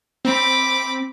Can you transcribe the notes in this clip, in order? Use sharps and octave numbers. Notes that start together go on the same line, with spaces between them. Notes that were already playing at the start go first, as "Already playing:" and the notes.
C4 B5 D6